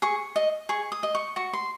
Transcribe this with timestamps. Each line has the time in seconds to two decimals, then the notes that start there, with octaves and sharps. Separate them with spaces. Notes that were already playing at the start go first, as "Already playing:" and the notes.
0.02 G#4 C#6
0.36 D#5
0.69 G#4 C#6
0.92 D#6
1.03 D#5
1.15 C#6
1.36 F#4 C#6
1.53 C6